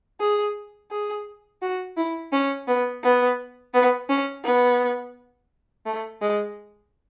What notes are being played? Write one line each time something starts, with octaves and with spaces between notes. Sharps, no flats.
G#4
G#4
F#4
E4
C#4
B3
B3
B3
C#4
B3
A3
G#3